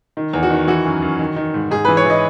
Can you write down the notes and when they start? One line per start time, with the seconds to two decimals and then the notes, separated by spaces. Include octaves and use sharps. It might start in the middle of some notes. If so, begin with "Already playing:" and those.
0.17 D#3
0.33 E2
0.43 F#4
0.50 D#3
0.67 E3 F#4
0.85 F#2
1.02 F#2
1.19 D#3
1.36 D#3
1.54 G#2
1.71 G#2 G#4
1.85 E3 B4
1.97 C#5
2.05 E3 D#5